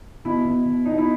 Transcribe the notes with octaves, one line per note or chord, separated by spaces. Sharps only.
B2 E4
B2
B2
B2 D#4
E4